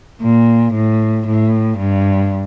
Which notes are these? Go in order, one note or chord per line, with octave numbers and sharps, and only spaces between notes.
A#2
A2
A2
G2